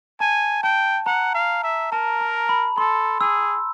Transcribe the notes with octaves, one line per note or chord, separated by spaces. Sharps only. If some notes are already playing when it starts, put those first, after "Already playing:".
G#5 A5
G5 A5
F#5 A#5
F5
E5
A#4 A5
A#5
B5
A4 C6
G#4 E6